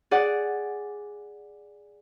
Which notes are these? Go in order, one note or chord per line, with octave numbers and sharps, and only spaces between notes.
G#4 D5 F#5